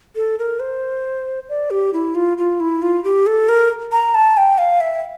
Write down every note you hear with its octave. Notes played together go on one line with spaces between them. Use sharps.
A4
A#4
C5
D5
G4
E4
F4
F4
E4
F4
G4
A4
A#4
A#5
A5
G5
F5
E5